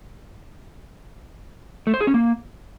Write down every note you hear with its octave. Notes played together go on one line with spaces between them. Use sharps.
A3
C5
G#4
C#4
A#3